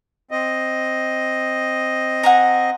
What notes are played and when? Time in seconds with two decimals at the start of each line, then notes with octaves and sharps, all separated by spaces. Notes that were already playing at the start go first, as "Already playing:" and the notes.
0.31 C4 D#5
2.23 F#5 G#5 A#5